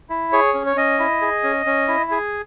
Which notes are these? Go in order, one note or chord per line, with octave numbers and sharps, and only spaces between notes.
E4
G#4 C#5
C#4
C#5
C#4 D#5
E4
G#4
C#4
C#4
E4
G#4